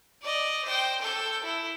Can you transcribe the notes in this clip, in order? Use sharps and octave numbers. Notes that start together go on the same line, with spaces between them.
D5 D#5
C5 G5
A4 G6
E4